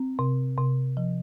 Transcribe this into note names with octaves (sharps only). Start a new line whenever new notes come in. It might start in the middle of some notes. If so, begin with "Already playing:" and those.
Already playing: C4
C3
C3
F3